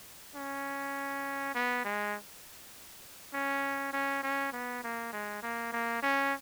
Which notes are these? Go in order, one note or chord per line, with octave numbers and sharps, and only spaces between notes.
C#4
B3
G#3
C#4
C#4
C#4
B3
A#3
G#3
A#3
A#3
C#4